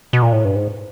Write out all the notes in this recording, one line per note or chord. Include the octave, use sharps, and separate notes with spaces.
B2
A#2
A2
G2
G#2